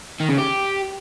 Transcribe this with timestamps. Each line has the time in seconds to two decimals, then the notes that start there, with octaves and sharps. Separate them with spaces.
0.20 D#3
0.29 C#3
0.38 G4